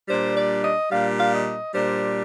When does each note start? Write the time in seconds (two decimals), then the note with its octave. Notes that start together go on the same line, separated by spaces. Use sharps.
0.08 A#2 G3 D4 C5
0.35 D5
0.63 D#5
0.91 A#2 G3 D4 F5
1.18 F5
1.32 D#5
1.74 A#2 G3 D4 C5